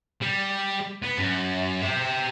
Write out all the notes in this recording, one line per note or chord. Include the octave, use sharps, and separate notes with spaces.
G3
B3
F#2
G4 E5